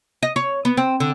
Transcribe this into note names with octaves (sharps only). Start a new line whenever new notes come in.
D#5
C#5
B3
C4
D3